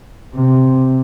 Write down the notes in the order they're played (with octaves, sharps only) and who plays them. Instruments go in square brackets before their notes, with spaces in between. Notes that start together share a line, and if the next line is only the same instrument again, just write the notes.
[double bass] C3